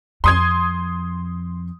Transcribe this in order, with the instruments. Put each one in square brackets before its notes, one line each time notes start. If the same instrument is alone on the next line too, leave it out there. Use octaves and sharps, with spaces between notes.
[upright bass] F2 [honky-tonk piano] C6 D#6 G#6